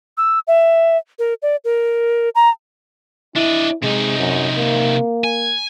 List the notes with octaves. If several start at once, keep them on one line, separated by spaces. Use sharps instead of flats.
E6
E5
A#4
D5
A#4
A#5
D4 E4 D#5
C3 G#3 D#4
F#2
A#3
G#5